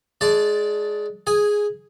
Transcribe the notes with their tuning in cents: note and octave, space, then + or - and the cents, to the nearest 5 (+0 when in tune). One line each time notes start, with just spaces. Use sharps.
G#3 +15 D5 -10 A5 +0
G#4 +0 G#5 -10